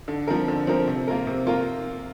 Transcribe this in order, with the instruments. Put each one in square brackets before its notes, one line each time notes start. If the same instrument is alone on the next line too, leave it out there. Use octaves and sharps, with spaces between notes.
[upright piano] D3
F3 C4 A#4
D3
F3 C4 A#4
C3
A#3 F4 A#4
C3
A#3 F4 A#4